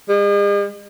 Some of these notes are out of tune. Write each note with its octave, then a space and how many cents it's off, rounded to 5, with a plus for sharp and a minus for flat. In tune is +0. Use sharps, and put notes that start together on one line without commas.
G#3 -45